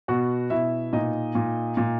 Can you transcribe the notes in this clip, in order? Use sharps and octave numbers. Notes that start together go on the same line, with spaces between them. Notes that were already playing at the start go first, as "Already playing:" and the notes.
B2 F#4 F#5
B2 E4 E5
A#2 D#4 D#5
A#2
A#2